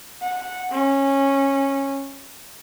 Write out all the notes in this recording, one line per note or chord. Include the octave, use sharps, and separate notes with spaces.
F#5
C#4